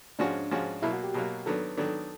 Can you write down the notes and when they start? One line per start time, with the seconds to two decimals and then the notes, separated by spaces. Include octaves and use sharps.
0.19 G#2 F3 G#3 C#4 D4 F#4
0.51 G#2 F3 G#3 C#4 F#4
0.82 B2 F#3 A#3 E4
0.93 F#4
1.03 G4
1.14 B2 F#3 A#3
1.46 D#3 F#3 B3 D4 A4
1.77 D#3 F#3 B3 D4 A4